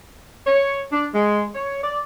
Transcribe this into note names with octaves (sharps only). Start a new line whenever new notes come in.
C#5
D4
G#3
C#5
D5